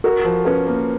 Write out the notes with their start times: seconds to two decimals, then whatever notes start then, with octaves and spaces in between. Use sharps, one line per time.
0.04 F#4 A#4
0.25 F3
0.45 C#4 B4
0.67 A#3